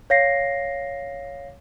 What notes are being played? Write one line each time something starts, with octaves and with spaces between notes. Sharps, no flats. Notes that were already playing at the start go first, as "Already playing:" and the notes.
C#5 F5 A#6 C7